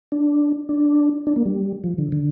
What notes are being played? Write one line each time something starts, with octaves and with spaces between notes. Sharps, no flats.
D4
D4
D4
A#3
G3
F3
D3
D3